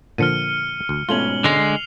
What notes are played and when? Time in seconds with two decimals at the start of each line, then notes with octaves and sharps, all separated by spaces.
0.18 A#2 D3 F3 F6 C#7 D#7
0.89 D2
1.09 G#2 B2 A3 C#4 F4 F#7 G7
1.44 D3 G#3 C7 F7